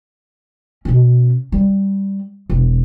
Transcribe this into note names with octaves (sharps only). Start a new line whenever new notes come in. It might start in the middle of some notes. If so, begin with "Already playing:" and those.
B2 C#4
G3
E1